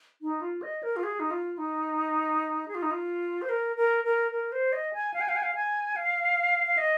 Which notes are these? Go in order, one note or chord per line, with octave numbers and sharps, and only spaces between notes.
D#4
F4
D#5
A#4
F4
G#4
D#4
F4
D#4
G#4
F4
D#4
F4
C5
A#4
A#4
A#4
A#4
C5
D#5
G#5
F5
G#5
F5
G#5
F5
G#5
F5
F5
D#5